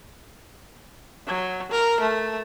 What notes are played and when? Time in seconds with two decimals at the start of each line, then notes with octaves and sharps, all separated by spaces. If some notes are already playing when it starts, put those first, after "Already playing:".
1.27 F#3
1.72 A#4
2.01 A3